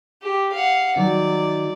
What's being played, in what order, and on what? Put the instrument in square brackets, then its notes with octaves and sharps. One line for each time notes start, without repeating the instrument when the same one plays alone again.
[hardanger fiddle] G4
F5 F#5
[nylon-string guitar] D#3 F#3 [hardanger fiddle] D5